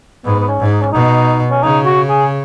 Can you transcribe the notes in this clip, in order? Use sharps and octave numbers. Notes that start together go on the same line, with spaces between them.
G#2 B3
B3
C#4
G#2
D#4
C#4
B2 D#4
C#4
C#3 D#4
F#4
G#4